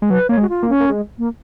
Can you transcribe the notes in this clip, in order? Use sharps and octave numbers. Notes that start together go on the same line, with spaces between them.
G#3
F#3 B4
A#3 C#5
G#3
F#4
F4
A#3
C#4
A#3
G#3
A#3